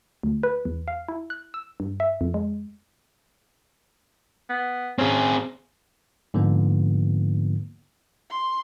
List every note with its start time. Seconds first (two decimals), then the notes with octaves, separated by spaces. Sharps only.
0.23 D2
0.43 B4
0.65 E2
0.88 F5
1.08 E4
1.30 F#6
1.54 E6
1.80 G2
2.00 E5
2.21 F2
2.34 G#3
4.49 B3
4.99 C4 C#4 G#4
6.34 G#2 D3 F3 A#3 B3
8.30 C6